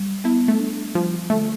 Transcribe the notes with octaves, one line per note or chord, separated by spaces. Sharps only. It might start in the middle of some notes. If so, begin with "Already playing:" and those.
Already playing: G3
B3 E4
A3
D4
F3 G3
D3 A3